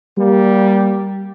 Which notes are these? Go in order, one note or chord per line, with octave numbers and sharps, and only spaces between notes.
G3 A#3